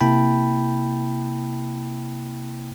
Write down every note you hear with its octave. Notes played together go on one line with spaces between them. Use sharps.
C3 A#3 E4 G5 A5 B5